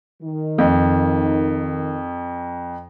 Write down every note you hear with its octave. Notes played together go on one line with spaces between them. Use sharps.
D#3
F2